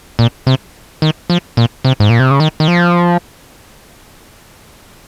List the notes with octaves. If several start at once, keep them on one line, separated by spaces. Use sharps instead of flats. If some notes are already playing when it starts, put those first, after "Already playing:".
A#2
C3
D#3
F3
A#2
C3
G#2
A#2
C3
C#3
D#3
D#3
F3